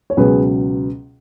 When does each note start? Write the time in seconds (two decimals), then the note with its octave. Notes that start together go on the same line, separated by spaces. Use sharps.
0.10 C#5
0.17 C#2 B2 F#3 G#4 B4